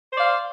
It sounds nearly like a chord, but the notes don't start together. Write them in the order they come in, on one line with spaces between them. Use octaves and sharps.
C5 D5 F5